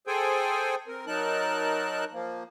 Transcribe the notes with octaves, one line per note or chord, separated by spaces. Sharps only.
G#4 A4 C5 G5 G#5
C4 A#4
F#3 D#4 A#4 A5 F#6
F3 A#3